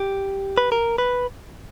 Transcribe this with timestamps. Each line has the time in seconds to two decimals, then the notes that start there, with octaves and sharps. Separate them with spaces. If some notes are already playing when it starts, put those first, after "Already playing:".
Already playing: G4
0.58 B4
0.72 A#4
0.98 B4